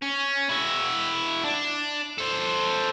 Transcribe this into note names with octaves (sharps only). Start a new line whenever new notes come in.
C#4
E4 F#4
D4
A4 C5